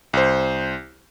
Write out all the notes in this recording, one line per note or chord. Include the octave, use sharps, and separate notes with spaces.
C2 C5